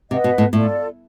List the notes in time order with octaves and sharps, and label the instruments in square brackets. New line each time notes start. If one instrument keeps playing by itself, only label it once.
[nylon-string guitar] C3 [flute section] B4 D#5 F#5
[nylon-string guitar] B2
A2
[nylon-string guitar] A2 [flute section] F4 A4 D5